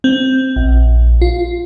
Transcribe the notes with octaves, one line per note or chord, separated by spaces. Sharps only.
C4
A#1
F4